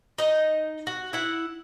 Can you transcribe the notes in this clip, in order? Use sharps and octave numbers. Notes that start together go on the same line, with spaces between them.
D#4 D#5
F#4
E4 F#5